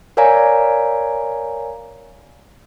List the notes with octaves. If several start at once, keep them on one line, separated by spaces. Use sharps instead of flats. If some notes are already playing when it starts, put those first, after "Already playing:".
A#4 C#5 D5 F5 G#5 A#5